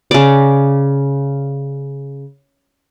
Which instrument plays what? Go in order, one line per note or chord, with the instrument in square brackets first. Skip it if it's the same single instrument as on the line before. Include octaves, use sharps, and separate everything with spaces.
[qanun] C#3 D5